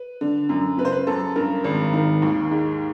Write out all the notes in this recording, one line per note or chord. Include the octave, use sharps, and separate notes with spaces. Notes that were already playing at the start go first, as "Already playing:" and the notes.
Already playing: B4
D3
F#2
C#3 B4
C5
B4
F#2 A4
G2 A#4
G#1
D#3
D#2
G#2